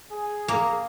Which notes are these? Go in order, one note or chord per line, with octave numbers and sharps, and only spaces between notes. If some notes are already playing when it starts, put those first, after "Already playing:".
G#4
A#3 A#5